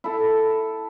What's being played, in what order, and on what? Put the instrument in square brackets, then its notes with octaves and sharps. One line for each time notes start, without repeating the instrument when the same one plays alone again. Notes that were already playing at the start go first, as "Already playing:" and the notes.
[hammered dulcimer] E4 A4